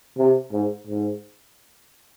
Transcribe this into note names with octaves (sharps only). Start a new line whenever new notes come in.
C3
G#2
G#2